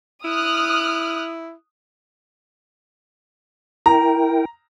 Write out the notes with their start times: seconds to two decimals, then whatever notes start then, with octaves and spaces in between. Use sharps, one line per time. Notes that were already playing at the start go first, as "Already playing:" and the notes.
0.24 E4 D#6 F6 F#6
3.86 E4 A#4 G5 A#5